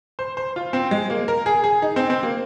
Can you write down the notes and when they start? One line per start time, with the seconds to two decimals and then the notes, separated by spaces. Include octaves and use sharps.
0.19 C5
0.37 C5
0.56 F4
0.73 C4
0.91 G#3
1.10 A#3
1.28 A#4
1.46 G#4
1.64 G#4
1.82 D#4
1.96 C4
2.10 C4
2.23 A#3